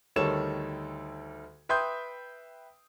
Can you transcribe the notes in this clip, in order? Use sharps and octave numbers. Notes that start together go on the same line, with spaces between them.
D2 D#3 G3 A4 C#5 E7
B4 E5 G5 C6 D#6 G6